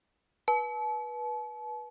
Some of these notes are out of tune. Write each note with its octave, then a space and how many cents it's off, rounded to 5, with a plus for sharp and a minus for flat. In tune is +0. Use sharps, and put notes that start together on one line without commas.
B4 -25 A5 -40